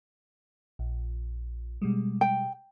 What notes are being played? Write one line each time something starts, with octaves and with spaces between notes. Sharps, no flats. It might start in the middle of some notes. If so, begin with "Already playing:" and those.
A#1
B2 G3 G#3
G5